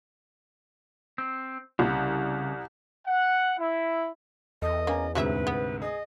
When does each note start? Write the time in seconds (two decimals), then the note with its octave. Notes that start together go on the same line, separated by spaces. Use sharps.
1.18 C4
1.79 C2 C#3 G3
3.07 F#5
3.58 E4
4.62 E2 A4 D#5
4.87 A#3 C#4 G#5 A#5
5.15 D2 G#2 C3 F#3 G#4 B4 E5
5.47 B3
5.82 G#4 D#5